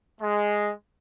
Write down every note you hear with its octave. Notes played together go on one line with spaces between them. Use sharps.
G#3